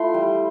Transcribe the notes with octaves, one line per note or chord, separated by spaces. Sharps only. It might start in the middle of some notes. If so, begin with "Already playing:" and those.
Already playing: A3 E4 F4 C6
G3